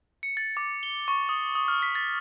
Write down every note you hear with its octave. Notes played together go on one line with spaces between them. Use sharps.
C#7
A6
D6
G7
C#6
D#6
D#6
F6
B6
A6